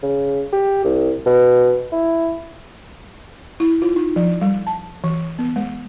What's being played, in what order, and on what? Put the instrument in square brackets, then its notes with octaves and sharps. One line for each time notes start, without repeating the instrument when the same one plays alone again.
[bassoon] C#3
G4
C2
B2
E4
[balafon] E4
F4
D#4
F3
G3
A5
E3
B3
G#3